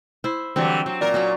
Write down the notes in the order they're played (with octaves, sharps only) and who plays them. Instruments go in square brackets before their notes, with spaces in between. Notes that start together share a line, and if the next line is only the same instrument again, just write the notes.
[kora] E4 C5
[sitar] D3 E3 G3 [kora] F#3 C4
[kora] F#3 [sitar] C4
[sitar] A#2 A#4 [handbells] D5
[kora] F#3 C#4 F#4